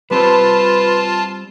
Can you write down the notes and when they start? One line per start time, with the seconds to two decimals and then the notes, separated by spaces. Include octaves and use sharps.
0.11 G3 C4 F4 B4 C5 A5